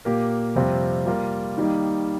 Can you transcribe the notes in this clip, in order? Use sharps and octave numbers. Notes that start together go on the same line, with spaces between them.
A#2 A#3 G4 A#4
F2 C3 G3 C4 F4
G3 A#3 F4 A#4
D#3 G3 A#3 D#4